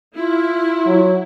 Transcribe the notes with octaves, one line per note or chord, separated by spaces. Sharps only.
E4 F4
F#3